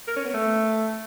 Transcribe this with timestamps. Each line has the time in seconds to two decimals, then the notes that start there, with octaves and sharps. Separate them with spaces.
0.07 A#4
0.16 C#4
0.25 B3
0.34 A3